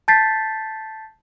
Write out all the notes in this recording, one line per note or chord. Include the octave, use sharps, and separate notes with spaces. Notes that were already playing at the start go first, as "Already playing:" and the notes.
A5 G6 A6 B6 C7